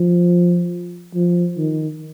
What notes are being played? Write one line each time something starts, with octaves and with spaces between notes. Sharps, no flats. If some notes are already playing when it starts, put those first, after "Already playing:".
Already playing: F3
F3
D#3